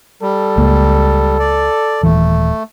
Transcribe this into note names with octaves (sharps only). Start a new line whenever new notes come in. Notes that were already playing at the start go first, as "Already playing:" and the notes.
G3 A4
C#2 G#3 A#3
D5
D#1 E3 A3